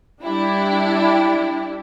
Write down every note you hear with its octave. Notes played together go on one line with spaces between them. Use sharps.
G3 D4 E4 G4